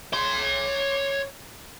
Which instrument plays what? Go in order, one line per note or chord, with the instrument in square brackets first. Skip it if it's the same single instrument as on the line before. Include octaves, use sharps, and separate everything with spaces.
[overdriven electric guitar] C#5 C6